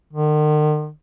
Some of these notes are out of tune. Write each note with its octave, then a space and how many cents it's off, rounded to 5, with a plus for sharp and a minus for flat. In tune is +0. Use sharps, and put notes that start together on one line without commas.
D#3 -45